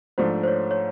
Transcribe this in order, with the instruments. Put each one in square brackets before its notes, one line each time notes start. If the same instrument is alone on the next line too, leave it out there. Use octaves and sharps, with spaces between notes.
[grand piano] G#2 F3 A3 D4 [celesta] C5
[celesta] C5
C#5
C#5